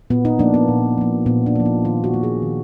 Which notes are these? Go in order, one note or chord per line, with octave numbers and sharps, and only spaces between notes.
A#2 B3
D#4
F3 A#3 D4
B3
A#2
F3 A#3
A#2 B3
D4
F3 A#3
D#4
D#3 F4
F#4
A#3
G#4
D#3